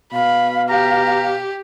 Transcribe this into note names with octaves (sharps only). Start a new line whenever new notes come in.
B2 F5 B5
G4 A#5